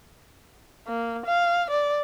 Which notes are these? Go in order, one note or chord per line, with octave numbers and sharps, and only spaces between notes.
A#3
F5
D5